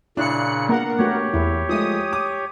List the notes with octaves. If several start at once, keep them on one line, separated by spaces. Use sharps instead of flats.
A#2 C#3 D4 E4 F#6 C#7
A#3 B3 A#4 F#5
A3 B3 F#4 G4 C#5
E2 E4
F3 G#3 A3 D#6
D6